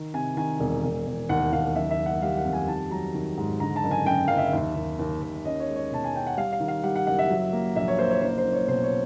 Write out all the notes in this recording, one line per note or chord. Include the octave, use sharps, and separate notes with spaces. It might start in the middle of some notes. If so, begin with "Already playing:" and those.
Already playing: D#3
C3 G#5
D#3 G#5
E1
E1
E1
D#2 F#5
D#2 F5
F#1 E5
E5
F#1
F#5
G3 F5
F#5
F2
G#5
D#3 A5
F#3 A#5
D#3
G#2
D3 A#5
A5
F#1
G#5
F#2 G5
F#1 F5
E5
D#2
D#2
D#2
D#2
C#4 D#5
C#5
G#3
C#5
B2 A5
G#5
C#4 G5
F#5
G3 F5
F5
D#3
F5
G3 F#5
F#5
F#1 F#5
E5
F#3
A#3
A#1 E5
C#5
A#3 C5
C#5
F#1 C5
C5
F#1
C#5
B2 C5
C#5